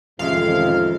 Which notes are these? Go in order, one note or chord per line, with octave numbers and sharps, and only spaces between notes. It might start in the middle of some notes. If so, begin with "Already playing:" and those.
A1 F2 C3 D#3 G#3 E5 F5